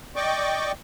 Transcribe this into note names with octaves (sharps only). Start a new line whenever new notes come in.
D5 D#5 G5 C#6 D6